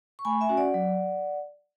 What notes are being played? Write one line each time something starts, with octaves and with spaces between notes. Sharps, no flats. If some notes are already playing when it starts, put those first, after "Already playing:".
C#6
A3 G#5 B5
E5 G#5
C#4 F#4
D5 F#5
F#3